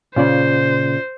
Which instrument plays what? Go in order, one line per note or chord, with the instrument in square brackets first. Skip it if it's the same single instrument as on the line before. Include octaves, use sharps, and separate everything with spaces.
[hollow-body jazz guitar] A#2 C#3 [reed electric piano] C#4 F4 D5 [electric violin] C5